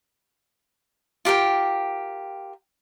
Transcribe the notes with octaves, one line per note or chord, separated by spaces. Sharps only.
F4 G4 A#4 G5